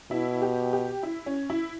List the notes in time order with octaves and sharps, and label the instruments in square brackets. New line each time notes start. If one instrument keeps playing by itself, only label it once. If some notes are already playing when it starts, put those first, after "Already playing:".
[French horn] B2 [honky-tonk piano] E4
[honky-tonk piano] G4
G4
E4
C#4
E4